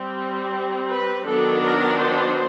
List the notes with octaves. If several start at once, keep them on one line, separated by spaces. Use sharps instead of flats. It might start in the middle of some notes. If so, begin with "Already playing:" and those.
Already playing: G3 C4
B4
D#3 F#3 B3 D4 A4
A#4
C5